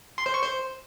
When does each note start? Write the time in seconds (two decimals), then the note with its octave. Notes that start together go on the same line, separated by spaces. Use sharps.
0.18 C6
0.26 C5
0.34 C#6
0.42 C5